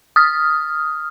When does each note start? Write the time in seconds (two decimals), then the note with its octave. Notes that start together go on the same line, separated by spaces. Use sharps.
0.16 D#6 F6